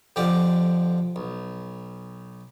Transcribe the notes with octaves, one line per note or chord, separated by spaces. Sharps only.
F2 D3 F3 G4 D5
B1